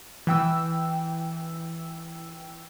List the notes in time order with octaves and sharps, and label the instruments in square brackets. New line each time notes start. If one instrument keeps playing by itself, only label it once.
[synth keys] E3 G5 E6